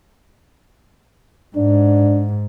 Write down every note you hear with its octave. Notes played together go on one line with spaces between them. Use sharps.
G#2 D4